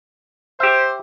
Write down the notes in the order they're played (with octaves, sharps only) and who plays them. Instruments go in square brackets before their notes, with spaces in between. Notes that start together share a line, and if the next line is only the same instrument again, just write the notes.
[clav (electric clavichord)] G4 E5 [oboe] C5